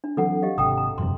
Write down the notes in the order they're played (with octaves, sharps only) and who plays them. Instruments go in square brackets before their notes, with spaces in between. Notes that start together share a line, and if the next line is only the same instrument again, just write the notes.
[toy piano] D4
[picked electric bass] E3 F#3 C4 [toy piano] A4 F#5
[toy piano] G4 D#5 F5
[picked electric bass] G#1 C3 [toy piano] G5 A#5 D#6
[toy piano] A#5
[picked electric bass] E1 F#2 C3 [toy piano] C6